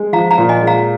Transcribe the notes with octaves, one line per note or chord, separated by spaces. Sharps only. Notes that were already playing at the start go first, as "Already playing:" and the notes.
Already playing: G#3
F3 F5 A#5
F5 A#5
A#2
D#5 G#5
G#3
F5 A#5